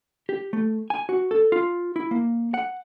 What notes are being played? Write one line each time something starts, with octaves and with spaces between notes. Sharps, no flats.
G4
A3
G#5
F#4
A4
F4
E4
A#3
F#5